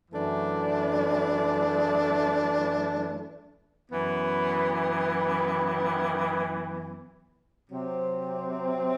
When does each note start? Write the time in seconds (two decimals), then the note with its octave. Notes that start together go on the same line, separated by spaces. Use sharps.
0.11 F#2 E3 A3 D4
3.89 F#2 E3 B3
7.68 C3 F#3 C4